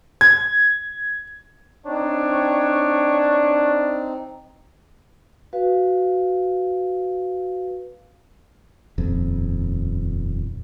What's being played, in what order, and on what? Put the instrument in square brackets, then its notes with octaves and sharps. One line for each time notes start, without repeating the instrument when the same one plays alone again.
[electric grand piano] G#6
[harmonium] C4 D#4 [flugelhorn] D4 [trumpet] C#5
[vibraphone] F#4 B4 F5
[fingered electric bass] D#1 F2